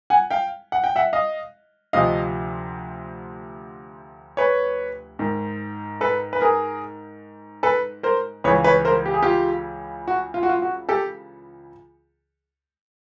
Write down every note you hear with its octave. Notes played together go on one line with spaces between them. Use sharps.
F#5 G#5
F5 G5
F#5
G5
E5 F#5
D#5 F5
D2 C3 F3 D#5 F5
B4 C#5
G#2 D#3
A4 B4
B4
G#4 A#4
A4 B4
A#4 C5
C#2 C#3 E3 B4 C#5
B4 C#5
A#4 C5
G4
G#4
F4 G4
F#4
F4
F#4
F4
F#4
G4 A4